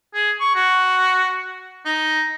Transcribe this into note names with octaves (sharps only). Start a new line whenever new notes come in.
G#4
C#6
F#4
D#4